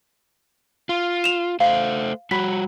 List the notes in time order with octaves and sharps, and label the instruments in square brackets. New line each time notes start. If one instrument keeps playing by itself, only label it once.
[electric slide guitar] F4
[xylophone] E7 F7
[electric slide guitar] A3 C5 [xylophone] F5
[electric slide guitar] G3 F#4 [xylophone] B5 B6